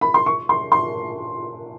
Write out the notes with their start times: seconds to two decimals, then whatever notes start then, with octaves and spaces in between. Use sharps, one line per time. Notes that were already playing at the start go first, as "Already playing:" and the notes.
0.01 B5
0.14 C6
0.26 C#6
0.49 C6
0.72 C6